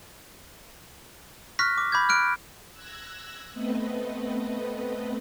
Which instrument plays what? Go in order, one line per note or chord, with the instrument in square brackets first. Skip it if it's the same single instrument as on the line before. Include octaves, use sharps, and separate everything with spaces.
[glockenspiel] C#6 F6 F#6 A#6 B6
D6
B5 D6 G6 G#6
F6 F#6 D7
[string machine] E6 F#6 G#6 A#6
A3 B3 C4 B4 D#5